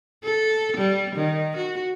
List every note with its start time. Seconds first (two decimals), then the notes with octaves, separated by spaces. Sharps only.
0.24 A4
0.77 G3
1.15 D#3
1.57 F#4